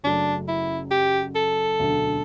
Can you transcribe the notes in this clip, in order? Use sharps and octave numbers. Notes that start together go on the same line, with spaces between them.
F#1 F#2 F#3 A3 D4
E4
G4
A4
E1 D2 D3 F#3